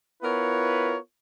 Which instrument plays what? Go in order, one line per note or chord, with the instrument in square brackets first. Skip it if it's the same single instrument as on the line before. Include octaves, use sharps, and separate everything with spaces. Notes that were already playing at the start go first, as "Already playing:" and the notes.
[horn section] B3 E4 F4 A#4 B4 C#5